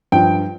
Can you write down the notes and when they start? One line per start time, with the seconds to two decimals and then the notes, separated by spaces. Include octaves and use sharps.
0.12 G2 F3 G5